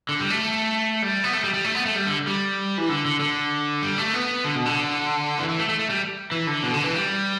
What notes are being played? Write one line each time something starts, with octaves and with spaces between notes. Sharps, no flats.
D3
G3
A3
G3
B3
A3
G3
G3
A3
B3
A3
G3
D3
G3
E3
D3
D3
D3
G3
A3
B3
D3
B2
D3
E3
E3
A3
A3
A3
G3
E3
D3
B2
D3
E3
G3